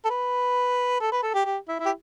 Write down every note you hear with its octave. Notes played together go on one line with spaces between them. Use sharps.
A4
B4
A4
B4
A4
G4
G4
E4
E4
G4